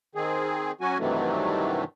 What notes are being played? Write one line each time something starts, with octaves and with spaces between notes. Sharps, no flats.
D#3 C4 G#4
F#3 C#4 F#4 G#5
G2 C3 D#3 E3 F#3 A3